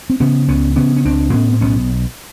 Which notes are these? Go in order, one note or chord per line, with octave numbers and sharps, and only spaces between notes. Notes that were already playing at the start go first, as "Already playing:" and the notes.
C4
C#3 B3 C#4
C#2 B3 C#4
C#3 B3 C#4
C#4
C#2 C4 D4
A2 B3 C#4
C4
B1 B3 C#4